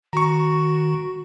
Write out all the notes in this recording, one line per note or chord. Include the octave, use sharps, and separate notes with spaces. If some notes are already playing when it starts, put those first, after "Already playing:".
D#3 F#4 A#5 C#6